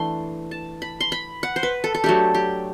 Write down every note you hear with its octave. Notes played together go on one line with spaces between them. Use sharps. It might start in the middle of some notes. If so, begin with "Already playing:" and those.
Already playing: E3 A3 D4 C6
A5
B5
C6
B5
F#5
C5
B4
A4
A4
F#3 A3 D4 G4
G4